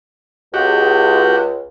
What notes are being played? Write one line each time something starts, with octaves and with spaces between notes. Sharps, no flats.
C#2 F#4 G4